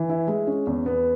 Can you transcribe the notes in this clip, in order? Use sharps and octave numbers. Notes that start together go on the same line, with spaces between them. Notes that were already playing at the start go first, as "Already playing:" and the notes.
Already playing: E3
E4
G#3
C#4
E2
B3